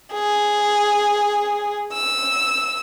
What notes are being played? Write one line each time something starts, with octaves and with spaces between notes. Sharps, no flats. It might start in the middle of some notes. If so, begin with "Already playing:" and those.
G#4
E6